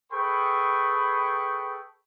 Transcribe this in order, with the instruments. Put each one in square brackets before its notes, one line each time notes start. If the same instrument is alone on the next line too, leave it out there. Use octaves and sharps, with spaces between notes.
[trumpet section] G#4 A4 B4 G5 B5 C#6